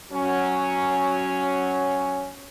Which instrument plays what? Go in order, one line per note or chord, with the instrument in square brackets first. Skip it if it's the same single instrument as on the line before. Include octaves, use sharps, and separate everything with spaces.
[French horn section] F#3 C#4